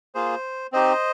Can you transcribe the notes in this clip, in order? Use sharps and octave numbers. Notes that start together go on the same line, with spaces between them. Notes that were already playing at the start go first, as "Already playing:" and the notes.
A#3 F4 G#4 C5
C4 D#4 G4 C5 D#5